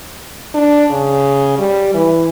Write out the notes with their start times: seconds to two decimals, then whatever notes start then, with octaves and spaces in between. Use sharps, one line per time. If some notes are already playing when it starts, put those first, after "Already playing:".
0.54 D4
0.90 C#3
1.59 G3
1.94 E3